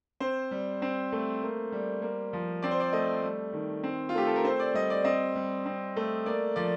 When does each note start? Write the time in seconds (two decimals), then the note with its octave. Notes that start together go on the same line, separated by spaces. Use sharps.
0.20 C4 C5
0.51 G3
0.82 C4
1.12 A3
1.43 A#3
1.72 G3
2.02 A#3
2.33 F3
2.62 C4 D5
2.71 C5
2.80 D5
2.93 A3 D#5
3.23 G3
3.53 D#3
3.83 C4
4.09 F4
4.15 A3 G4
4.27 A4
4.36 A#4
4.44 C4 C5
4.59 D5
4.74 G3 D#5
4.90 D5
5.05 C4 D#5
5.36 G3
5.66 C4
5.96 A3
6.26 A#3 D5
6.56 F3 D5